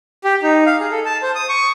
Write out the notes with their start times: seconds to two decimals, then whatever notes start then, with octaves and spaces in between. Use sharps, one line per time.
0.24 G4
0.43 D#4
0.66 F5
0.79 G#4
0.91 A4
1.05 A5
1.22 C5
1.35 D#6
1.49 C#6